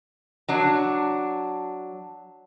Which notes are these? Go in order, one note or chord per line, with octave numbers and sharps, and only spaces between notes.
F#3 D4